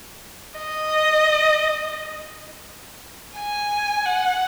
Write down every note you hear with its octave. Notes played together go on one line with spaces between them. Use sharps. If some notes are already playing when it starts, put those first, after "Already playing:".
D#5
G#5
F#5